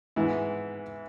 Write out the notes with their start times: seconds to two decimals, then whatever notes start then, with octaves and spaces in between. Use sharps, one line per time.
0.16 G#2 E3 B3 E4